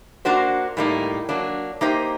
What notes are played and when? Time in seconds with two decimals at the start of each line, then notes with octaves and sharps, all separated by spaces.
0.25 A#3 D4 F#4 C5
0.77 A2 G3 A#3 D#4
1.29 F#3 A#3 D4
1.81 A#3 D#4 G4 C5 D#5